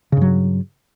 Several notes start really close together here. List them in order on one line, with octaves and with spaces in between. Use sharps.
C#3 G2 F#3